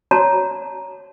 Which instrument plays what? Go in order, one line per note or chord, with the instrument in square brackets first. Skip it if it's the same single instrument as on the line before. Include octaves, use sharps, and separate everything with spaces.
[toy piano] F#4 C#5 A5 A#5